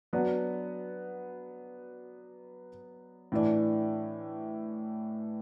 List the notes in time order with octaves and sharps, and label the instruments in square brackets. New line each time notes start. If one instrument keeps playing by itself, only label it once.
[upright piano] F#3 B3 D4 F#4
A2 E3 D4